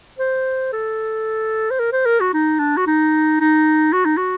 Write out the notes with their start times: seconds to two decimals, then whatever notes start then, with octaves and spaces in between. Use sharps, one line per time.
0.19 C5
0.73 A4
1.71 C5
1.80 A#4
1.92 C5
2.06 A#4
2.20 F#4
2.34 D#4
2.59 D4
2.77 F#4
2.87 D#4
3.40 D#4
3.93 F#4
4.05 D#4
4.17 F#4